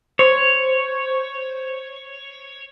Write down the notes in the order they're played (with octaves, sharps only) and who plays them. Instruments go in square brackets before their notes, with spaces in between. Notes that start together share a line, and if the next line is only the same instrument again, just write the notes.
[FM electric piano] C5 [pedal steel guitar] C#5